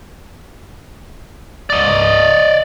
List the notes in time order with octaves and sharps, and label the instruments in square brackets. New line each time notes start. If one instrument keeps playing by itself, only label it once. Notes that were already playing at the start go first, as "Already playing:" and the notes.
[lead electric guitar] D5 D#5